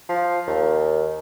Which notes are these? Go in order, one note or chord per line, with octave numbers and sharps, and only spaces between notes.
F3
D#2